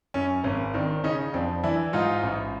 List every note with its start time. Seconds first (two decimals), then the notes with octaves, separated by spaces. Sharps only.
0.14 F#2 C#4
0.44 G#1 C#4
0.74 D#3 C4 D4
1.04 C#3 C#4 D#4
1.33 F2 C4 D4
1.64 E3 D4 E4
1.93 G#2 D#4 F4
2.23 A1